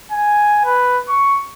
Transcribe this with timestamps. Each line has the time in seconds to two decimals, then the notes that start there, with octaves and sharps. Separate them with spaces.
0.12 G#5
0.65 B4
1.09 C#6